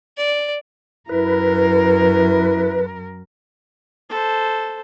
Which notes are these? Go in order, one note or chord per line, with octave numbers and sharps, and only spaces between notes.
D5
F#2 E4 A#4 B4
A4 C5